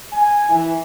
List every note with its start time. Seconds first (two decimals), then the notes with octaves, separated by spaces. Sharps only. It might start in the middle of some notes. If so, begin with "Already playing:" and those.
0.12 G#5
0.49 E3